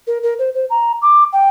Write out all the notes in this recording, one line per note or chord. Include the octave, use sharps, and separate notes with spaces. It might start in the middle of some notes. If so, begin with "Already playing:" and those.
A#4
A#4
C5
C5
A#5
D6
G5